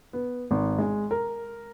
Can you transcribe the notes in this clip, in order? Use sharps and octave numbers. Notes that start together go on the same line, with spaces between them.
B3
G#1
G#3
A#4